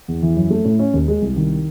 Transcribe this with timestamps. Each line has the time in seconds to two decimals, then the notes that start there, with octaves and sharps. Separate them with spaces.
0.08 E2
0.22 E3
0.36 F#2
0.50 A3
0.65 A2
0.79 C#4
0.93 D#2
1.08 G#3
1.22 C2
1.37 D#3